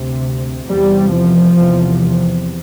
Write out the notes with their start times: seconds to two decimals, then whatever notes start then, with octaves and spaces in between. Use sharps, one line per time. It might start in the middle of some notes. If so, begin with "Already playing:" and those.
Already playing: D2 C3
0.66 E2 C3 G3
1.11 F3
1.56 E2 C3